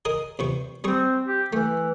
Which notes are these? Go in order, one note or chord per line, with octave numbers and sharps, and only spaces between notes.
G#4 A#4 D#5
E2 C3 C#6
G3 C4 G#4 C#6
G4
E3 A3